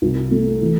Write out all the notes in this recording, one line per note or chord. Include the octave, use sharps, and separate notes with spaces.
C2
A3
E3